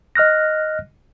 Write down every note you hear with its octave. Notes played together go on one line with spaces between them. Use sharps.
D#5 F6 F#6 A#6